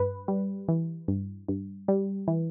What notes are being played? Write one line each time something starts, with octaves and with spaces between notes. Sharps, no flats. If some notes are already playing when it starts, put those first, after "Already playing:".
Already playing: G2 B4
G3
E3
G2
G2
G3
E3